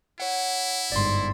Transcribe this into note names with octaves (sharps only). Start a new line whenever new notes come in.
E4 C#5 F#5
G1 G#2 D5 C6